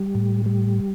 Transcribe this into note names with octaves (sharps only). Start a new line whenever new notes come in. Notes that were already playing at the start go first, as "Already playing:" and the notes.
Already playing: G3
A2
G3